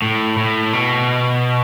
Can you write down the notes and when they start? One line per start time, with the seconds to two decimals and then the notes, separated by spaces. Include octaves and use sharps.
0.02 A2
0.37 A2
0.73 B2